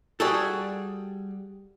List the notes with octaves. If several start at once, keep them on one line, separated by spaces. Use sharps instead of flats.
G3 F#4 G#4 A4